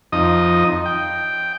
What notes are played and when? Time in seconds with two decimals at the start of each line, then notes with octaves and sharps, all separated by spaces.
0.12 F2 D#4 D#5
0.86 G5